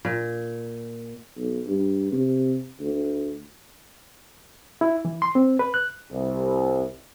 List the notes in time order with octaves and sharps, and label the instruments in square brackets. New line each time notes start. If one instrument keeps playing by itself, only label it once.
[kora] A#2
[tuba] B1
G2
C3
D2
[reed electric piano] E4
E3
C6
C4
B4
F#6
[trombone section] C2